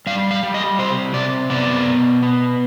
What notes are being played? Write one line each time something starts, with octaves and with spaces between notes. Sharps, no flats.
G3 F5
F5
G3
D#5
C3 C5
C3 D5
B3 D5
B2
B3